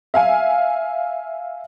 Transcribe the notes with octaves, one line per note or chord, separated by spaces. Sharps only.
E5 F5 G#5